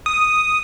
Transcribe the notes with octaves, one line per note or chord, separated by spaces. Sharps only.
D#6